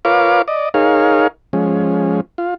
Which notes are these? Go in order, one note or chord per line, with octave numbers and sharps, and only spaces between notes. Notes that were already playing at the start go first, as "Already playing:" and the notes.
F4 A#4 B4 C#5 F5 D6
D5 D#5
D#4 G#4 A#4 C#5 F5
F3 G#3 C#4
F4